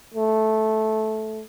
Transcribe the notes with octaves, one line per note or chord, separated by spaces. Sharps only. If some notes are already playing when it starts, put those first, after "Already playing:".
A3